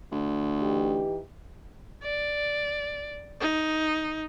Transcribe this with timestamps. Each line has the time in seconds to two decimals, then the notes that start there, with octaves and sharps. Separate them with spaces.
0.11 D2
0.61 E3 D#4 G4
2.03 D5
3.40 D#4